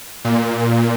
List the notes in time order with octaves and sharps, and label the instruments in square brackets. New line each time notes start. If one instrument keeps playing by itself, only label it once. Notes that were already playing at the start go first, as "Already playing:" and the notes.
[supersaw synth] A#2